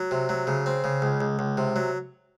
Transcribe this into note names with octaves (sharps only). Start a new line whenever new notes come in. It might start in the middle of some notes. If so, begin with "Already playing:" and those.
Already playing: F#3
C3
F#3
C#3
C4
C#3
C#2
C#2
C#2
C3
F#3